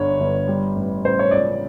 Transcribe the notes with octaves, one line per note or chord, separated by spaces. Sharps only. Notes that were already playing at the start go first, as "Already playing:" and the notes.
Already playing: G1 D3 C#5
G1
G3
A1
A1 C5
C#5
C#2 D5